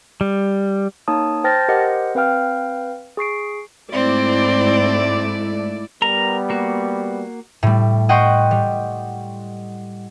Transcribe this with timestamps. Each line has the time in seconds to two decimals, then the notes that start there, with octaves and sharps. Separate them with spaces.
0.21 G3
1.08 A#3 D#4 C#5 A5 D#6
1.44 C5 G5 A5 F6 A6 A#6
1.68 G4 A#4 C5 D#5 F#5
2.15 C4 B4 F5 G5 F6
3.17 G#4 C#6 C7 D7
3.92 G#2 A3 C4 E4 D5
6.02 G3 B3 A#4 A#5
6.50 A#3 F#4
7.63 A2 G3
8.09 D#5 F#5 G5 C6 C#6
8.51 G3